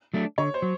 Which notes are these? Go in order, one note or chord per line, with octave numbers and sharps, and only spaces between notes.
F#3 A3 D4
D3 C#5
C5
F#3